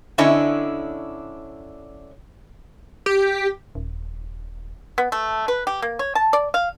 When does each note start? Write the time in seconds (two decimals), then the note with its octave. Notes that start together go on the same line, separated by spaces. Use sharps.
0.18 D3 C#4 D4 E4 C#5 D#5
3.06 G4
3.75 D#1
4.98 B3
5.12 A3
5.48 B4
5.67 G4
5.82 A#3
5.99 C#5
6.15 A5
6.33 D5
6.54 F5